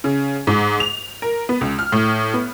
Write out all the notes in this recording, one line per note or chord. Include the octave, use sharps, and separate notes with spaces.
C#3
G#2
F7
A#4
B3
C#2
F6
A2
B3